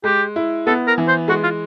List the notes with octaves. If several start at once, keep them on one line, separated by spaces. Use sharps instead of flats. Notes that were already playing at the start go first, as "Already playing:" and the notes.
G#3 G4
E4
B3 A4
A#4
E3
C5
G#3 F#4
F4